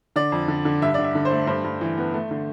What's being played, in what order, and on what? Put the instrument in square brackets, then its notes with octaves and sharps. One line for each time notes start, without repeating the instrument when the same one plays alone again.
[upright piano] D3 D5
F2
D3
D3
G2 E5
D3 D5
E5
D3
C5
A3
G2 C5
G2
E3
B3
A3
D3